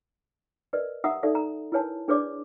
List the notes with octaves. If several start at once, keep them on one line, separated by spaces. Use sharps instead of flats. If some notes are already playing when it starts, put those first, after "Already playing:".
A#4 B4 D5 D#5
G4 E5 F#5 A#5 D#6 E6
D#4 A4 D5 E5 C#6
A#5
E4 A#4 B4 C#5 G#5 A5
D4 G#4 B4 C#5 D5 D6